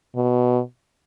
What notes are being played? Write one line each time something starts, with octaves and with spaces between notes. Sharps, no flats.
B2